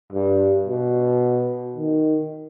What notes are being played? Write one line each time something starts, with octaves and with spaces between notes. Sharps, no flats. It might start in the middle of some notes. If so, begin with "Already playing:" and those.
G2
B2
D#3